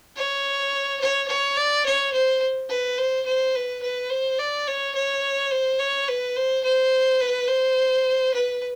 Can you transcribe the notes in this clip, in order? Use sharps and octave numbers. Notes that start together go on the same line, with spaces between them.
C#5
C#5
C#5
D5
C#5
C5
B4
C5
C5
B4
B4
C5
D5
C#5
C#5
C5
C#5
B4
C5
C5
B4
C5
B4